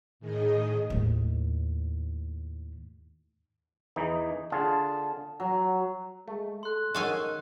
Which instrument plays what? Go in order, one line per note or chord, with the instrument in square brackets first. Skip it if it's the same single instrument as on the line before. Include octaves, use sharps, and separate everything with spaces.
[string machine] A2 D#3 G#4 D#5
[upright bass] D#2 A2
[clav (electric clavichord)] E2 E3 D#4
[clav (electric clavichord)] D3 F4 G#4 [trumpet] A5
[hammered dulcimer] F#3
[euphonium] G#3 [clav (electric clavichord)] A3
[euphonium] A4 [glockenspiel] C6 F#6
[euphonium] D#3 [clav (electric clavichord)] G#3 C#4 F#5 [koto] A4 F5 G#5